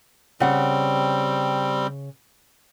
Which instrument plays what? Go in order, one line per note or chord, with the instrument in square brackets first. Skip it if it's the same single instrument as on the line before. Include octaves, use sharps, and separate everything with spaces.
[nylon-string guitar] C#3 F#5 [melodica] G3 C4